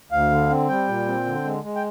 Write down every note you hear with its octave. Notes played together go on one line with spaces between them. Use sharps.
D2 F5
D3
C4
G3 G5
A#2
C4
D3
G#3
G#3
G5